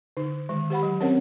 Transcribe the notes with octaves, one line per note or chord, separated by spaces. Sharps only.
D3 D#4
D#3 G#3
G4 C5 F#5 B5
F#3
C4 C#4 A#4 C5 C#5 F#5